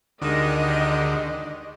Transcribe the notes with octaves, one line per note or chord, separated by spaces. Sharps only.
D2 D3 D#3 G#3 G4 D#5